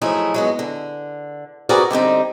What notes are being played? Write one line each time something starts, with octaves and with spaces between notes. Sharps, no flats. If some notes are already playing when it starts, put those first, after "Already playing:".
F3 F#3 A3 D#4 E4 G#4
F#3 G#3 B3
D3
C4 F#4 G#4 A#4 B4 D5
D3 G3 C4 D#4